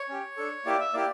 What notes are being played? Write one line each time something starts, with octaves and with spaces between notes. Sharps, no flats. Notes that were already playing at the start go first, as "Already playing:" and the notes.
Already playing: C#5
C#4 G4
D4 A4
A#3 E4 G4 D5
E5
A#3 E4 G4 D5